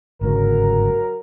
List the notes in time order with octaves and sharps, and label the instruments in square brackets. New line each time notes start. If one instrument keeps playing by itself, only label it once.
[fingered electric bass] G1 G#2 C#3 [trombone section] F#3 A#4